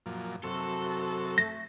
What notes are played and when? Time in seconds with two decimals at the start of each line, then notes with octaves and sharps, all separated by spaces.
0.06 F#2 A#2 F3
0.44 F#2 C3 F#4 A4
1.38 A3 A#6